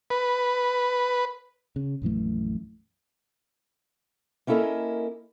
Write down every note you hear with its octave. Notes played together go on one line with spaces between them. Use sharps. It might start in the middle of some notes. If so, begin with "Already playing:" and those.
B4
C#3
A#1 F#2 E3 A3
A#3 C#4 E4 A4 A#4 D#5